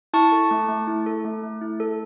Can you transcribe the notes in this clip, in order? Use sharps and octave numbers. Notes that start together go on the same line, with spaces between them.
E4 A5 C#6
A4
A3
A3
E4
A4
A3
A3
E4
A4